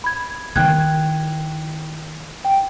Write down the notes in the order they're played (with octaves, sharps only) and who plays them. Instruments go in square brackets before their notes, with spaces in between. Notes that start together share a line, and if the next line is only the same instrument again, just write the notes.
[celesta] B5 G#6
[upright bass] D#3 E4 [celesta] G5 F#6 G#6
[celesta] G5